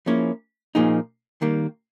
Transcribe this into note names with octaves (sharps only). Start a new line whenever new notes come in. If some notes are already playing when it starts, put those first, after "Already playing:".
F3 A#3 C#4 E4 G#4
A#2 F3 A#3 D#4 G#4
D#3 G3 A#3